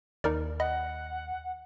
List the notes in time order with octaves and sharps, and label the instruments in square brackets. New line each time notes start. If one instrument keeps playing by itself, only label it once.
[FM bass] D#2 [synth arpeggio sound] D#4 A#4 D5
[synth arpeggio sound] D#5 B5 [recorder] F#5